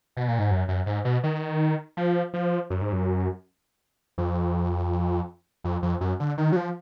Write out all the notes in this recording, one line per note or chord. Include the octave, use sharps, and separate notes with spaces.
B2
A#2
G#2
F#2
F#2
G#2
B2
D#3
F3
F3
F#2
G#2
F#2
F2
F2
F2
F#2
D3
D#3
F#3
F3